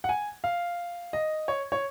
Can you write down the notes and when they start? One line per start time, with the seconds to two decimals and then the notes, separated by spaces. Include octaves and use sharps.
0.04 F#5
0.09 G#5
0.44 F5
1.13 D#5
1.48 C#5
1.72 C#5